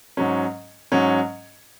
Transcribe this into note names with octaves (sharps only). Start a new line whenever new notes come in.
G#2 F#3 C#4
G#2 F#3 C#4